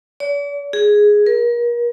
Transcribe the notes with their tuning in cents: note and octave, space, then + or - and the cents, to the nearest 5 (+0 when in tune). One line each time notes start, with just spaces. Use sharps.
D5 -45
G#4 +0
A#4 +35